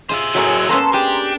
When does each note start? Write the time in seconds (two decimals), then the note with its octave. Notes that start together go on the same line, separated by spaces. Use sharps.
0.09 F4 G#4 C5 E5
0.35 A2 F#3 A3 G#4 A#4
0.69 A#3 B3 C#4 A4 A#5 C6
0.94 D4 G4 G#4